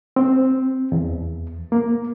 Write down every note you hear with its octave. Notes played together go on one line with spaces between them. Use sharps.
C4
E2
A#3